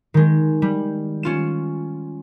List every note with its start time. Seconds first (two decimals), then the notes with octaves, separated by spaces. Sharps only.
0.14 D#3 G#3
0.62 G3
1.23 C#4 F4 E7